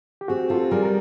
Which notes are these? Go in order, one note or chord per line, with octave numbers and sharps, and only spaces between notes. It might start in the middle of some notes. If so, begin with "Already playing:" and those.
G4
C4 F#4 G#4
F4 G4 A4
G3 G#4 A#4
A#4